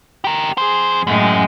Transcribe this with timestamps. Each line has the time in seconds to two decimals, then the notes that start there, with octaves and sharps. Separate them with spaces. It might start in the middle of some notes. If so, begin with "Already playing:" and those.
0.24 G4 A#4
0.58 F2 G#4 C5
1.07 F#2 A2 G#3 G5